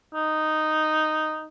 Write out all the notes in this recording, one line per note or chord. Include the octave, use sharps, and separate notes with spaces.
D#4